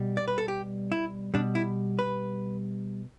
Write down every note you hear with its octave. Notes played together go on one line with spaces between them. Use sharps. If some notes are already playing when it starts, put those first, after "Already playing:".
Already playing: B2 G3
D5
B4
A4
G4
E4
B2 G3 D4
E4
B4